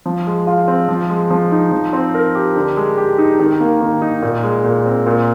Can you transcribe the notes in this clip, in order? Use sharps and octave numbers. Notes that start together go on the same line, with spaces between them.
F3
G#3
F4
C4
F3
G#3
F3
D#4
F3
C4
A#4
G4
D3
G#3
G4
D#4
D#3
A#3
D#3
D#4
A#2
G#3
A#2
C4
A#2